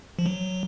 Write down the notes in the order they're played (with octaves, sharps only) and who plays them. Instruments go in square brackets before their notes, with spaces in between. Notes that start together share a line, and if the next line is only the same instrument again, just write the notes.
[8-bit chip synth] F3
F#3